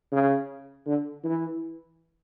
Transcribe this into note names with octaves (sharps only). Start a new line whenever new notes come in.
C#3
D3
E3